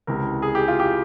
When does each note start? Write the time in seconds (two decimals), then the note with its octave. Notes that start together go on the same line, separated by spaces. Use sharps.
0.07 C#2 C3 E3 A#4
0.42 G#4
0.55 G4
0.68 F4
0.80 G4